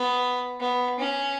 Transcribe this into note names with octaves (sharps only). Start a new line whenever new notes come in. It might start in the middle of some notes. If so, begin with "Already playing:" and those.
Already playing: B3
B3
C#4